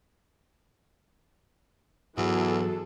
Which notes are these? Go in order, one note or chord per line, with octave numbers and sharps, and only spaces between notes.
E2 G#2 E3 F#3 F#4 G#4 A4